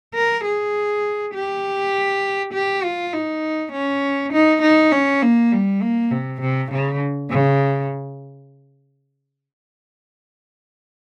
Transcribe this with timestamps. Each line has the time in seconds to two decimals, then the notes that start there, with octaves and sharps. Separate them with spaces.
0.15 A#4
0.45 G#4
1.34 G4
2.53 G4
2.83 F4
3.13 D#4
3.72 C#4
4.33 D#4
4.62 D#4
4.92 C#4
5.22 A#3
5.52 G3
5.81 A#3
6.11 C3
6.41 C3
6.71 C#3
7.30 C#3